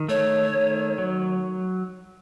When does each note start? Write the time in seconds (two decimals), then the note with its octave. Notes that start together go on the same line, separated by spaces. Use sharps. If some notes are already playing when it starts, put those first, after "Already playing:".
Already playing: D#3
0.09 A3 C#5
0.53 D#3
0.98 F#3